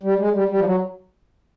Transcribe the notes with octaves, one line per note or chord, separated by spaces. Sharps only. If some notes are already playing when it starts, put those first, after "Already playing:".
G3
G#3
G3
G3
F3
F#3